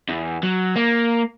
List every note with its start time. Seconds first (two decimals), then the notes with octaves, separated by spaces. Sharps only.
0.09 E2
0.43 F#3
0.76 A#3